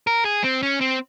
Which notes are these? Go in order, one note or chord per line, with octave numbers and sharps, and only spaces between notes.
A#4
G#4
C4
C#4
C4